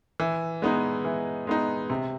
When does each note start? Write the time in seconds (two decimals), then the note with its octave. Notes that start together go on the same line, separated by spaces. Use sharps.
0.20 E3
0.62 G#3 B3 D#4
1.05 E3
1.47 G#3 B3 D#4
1.90 C3